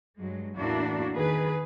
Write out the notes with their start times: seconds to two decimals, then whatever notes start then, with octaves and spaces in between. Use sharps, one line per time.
0.17 G2 F#3 G#3
0.57 E2 A2 A#3 D4 E4 F#4
1.14 D#3 G#4 B4